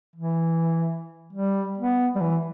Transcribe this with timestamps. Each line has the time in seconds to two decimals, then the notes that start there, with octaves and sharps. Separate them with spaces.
0.16 E3
1.33 G3
1.78 B3
2.15 G3
2.21 E3